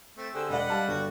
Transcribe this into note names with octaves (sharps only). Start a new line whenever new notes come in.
A3 C4
D3 G4 G#4 C5 E6
E1 D5 D#5 F#5 B5
G3 F5 A5
G1 F#4